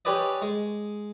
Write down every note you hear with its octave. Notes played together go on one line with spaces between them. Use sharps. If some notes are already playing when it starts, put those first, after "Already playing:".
C#4 G4 B4 D5 D#5
G#3